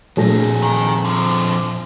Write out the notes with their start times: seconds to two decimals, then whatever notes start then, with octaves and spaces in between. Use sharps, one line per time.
0.17 F2 A#2 F#3 A3 D4 G#4 G#5 A#6
0.62 D#3
1.05 D3 F3